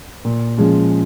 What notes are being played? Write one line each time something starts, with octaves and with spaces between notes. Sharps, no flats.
A#2
F3 G#3 C#4